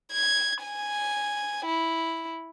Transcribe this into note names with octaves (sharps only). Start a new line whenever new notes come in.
G#6
G#5
E4